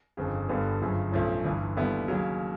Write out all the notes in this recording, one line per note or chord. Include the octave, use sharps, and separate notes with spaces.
G1 F2 C#3
G1 G2 D3 G3 B3
G1 F#2 C#3 F3
B1 A2 F3 A3 C#4
G1 G2 E3
D#2 D3 G3 B3 E4
D#2 C#3 F#3